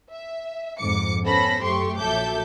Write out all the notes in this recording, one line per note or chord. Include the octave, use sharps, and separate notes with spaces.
E5
F2 G#2 D6 C#7
B3 C#4 A4 C5 B5 A#6
F#2 A3 G4 C6 C#6
A#1 F#3 A4 E5 D6 G6